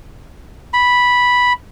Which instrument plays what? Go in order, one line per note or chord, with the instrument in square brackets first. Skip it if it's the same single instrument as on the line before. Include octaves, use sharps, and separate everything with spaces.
[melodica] B5